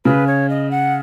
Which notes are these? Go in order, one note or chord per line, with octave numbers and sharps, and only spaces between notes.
C#3 B4
C#5
D#5
F#5